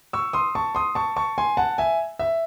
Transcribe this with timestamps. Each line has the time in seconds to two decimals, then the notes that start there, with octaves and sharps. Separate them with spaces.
0.13 C#6 E6
0.33 C6 D#6
0.55 A5 C#6
0.75 C6 D#6
0.95 A5 C#6
1.17 A5 C#6
1.38 G#5 C6
1.57 F#5 A5
1.78 E5 G#5
2.19 E5